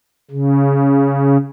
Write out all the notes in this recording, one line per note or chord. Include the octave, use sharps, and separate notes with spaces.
C#3